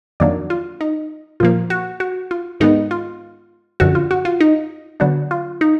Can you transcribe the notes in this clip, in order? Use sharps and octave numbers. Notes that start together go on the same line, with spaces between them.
F2 D#3 F#3 A#3 D4 D5
F4
D#4
A#2 F3 A#3 F4
F#4
F#4
F4
G#2 D#3 G#3 B3 D#4
F4
F#2 D3 F3 F#4
F4
F#4
F4
D#4
D3 F#3 B3 D4 F#4
F4
D#4